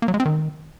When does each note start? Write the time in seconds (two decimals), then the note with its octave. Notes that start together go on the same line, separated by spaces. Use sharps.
0.02 A#3
0.08 F#3
0.14 G#3
0.20 C4
0.25 D#3